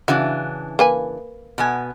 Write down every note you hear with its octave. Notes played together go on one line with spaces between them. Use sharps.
C#3 E3 D4 F#4
A#3 B4 G#5
B2 B3 G#5